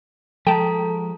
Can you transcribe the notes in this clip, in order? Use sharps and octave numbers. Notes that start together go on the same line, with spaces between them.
F3 G#3 A4 G5 A5 A#5